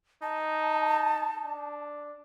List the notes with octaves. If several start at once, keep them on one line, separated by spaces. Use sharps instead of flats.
D#4 A5
D4